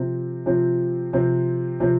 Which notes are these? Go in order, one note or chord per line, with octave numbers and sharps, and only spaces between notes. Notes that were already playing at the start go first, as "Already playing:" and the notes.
Already playing: C3 F3 C4
C3 F3 C4
C3 F3 C4
C3 F3 C4